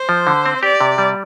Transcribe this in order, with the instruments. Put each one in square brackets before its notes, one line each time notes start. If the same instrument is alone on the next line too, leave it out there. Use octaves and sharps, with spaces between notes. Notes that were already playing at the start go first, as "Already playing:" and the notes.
Already playing: [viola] C5
[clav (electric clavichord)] F3
D3
C4
[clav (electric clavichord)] G4 [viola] D5
[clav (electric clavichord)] C3
G3